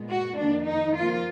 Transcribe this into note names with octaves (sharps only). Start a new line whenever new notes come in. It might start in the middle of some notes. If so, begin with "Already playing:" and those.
Already playing: A#2 G#3 B3
F#4
F2 D#3 A#3 D4
D#4
F2 F3 A#3 F4